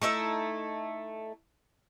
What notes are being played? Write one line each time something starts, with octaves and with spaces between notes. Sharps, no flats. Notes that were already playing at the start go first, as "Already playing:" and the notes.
A3 D#4 E4 E5